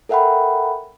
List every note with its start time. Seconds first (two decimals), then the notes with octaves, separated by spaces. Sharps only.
0.09 A4 A#4 E5 F#5 G5 B5